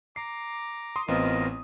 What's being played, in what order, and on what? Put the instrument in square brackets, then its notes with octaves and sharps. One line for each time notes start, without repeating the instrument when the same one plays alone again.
[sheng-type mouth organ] A#5 D6 [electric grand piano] C7
[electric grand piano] C6 D#6
[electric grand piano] A1 B3 C4 [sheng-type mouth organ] F4 A#4 D#5